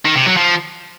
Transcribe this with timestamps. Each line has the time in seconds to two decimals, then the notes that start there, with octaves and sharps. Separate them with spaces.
0.05 D#3
0.16 C3
0.26 F#3
0.37 F3